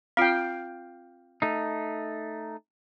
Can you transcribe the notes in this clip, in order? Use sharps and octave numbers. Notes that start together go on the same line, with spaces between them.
C4 F4 F5 G5
A3 D#4